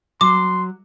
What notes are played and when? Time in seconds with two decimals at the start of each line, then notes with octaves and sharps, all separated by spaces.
0.21 F#3 C6 D6